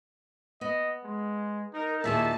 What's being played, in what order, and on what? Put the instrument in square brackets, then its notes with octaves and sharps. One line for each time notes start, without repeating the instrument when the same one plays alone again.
[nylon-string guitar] B3 [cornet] D#5
[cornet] G#3
[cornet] D#4 [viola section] A#4
[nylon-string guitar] D#2 A#2 D#3 [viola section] G#4 A5 [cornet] E5